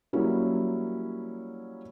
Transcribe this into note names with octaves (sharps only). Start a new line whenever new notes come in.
F#3 G3 A#3 C#4 E4